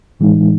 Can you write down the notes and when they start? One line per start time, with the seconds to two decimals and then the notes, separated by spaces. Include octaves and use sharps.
0.20 A2 E3 G#3 D#4